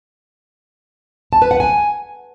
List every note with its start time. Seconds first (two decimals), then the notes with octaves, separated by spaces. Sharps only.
1.33 A5
1.42 B4
1.51 F#5
1.60 G#5